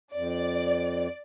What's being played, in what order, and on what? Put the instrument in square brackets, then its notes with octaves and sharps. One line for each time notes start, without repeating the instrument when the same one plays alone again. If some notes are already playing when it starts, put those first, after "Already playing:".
[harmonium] F2 [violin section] D5